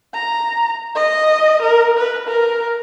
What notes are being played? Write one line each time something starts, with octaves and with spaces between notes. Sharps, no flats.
A#5
D#5
A#4
B4
A#4